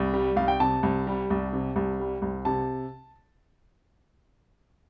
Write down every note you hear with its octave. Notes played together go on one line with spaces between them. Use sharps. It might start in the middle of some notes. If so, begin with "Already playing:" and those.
Already playing: C2
G3
C2 F5
G5
C3 A5
C2
G3
C2
C3
C2
G3
C2
C3 A5